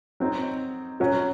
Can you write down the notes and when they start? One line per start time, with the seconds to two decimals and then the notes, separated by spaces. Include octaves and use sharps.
0.20 F#3 C4 D#4
1.00 F#3 C#4 F#4